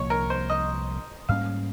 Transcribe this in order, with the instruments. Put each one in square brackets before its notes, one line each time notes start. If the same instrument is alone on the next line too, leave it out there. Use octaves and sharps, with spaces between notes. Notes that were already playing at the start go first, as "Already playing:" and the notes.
Already playing: [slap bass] C2 A#2 F3 A#3 [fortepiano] C#5
[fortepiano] A#4
C5
D#5
[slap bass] G#2 G3 A#3 C#4 [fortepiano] F5